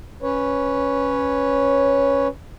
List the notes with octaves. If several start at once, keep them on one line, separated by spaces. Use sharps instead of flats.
C#4 B4 C#5